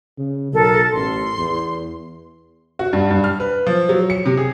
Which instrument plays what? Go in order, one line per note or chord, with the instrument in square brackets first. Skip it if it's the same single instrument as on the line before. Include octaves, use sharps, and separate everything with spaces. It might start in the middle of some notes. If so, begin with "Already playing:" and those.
[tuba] C#3
[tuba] B1 [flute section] A4 A#4
[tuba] A1 [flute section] C6
[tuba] E2
[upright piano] F#4
G2
G2
F6
B4
F3
F#3
C#7
C3
G#4